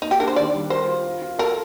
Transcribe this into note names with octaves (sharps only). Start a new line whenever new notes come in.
A#3 D#4
G4
D4 A#4
C5
D#3 D5
G3
A#4 C5
F4
F4
F4
A4 A#4